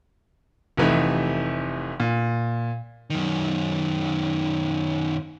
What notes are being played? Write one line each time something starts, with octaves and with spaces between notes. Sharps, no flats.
F1 C3 E3 A3 D#4 E5
A#2
F#2 D#3